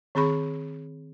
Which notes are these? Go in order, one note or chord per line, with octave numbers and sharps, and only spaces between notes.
D#3 C4 G#4 B5 C#6